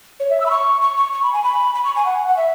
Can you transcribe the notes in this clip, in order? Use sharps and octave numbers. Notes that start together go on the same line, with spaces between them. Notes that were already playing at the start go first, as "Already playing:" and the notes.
C#5
E5
E6
B5
C#6
C#6
C#6
C#6
B5
G#5
B5
B5
C#6
G#5
F#5
F#5
E5